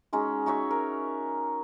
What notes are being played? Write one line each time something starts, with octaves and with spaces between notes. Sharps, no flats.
G#3 C#4 D#4 F#4
D#4 F#4 C#5 E5
A#4